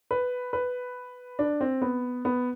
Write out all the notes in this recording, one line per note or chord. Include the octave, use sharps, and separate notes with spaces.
B4
B4
D4
C4
B3
B3